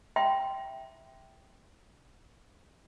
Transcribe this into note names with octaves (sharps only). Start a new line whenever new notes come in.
E5 G5 C6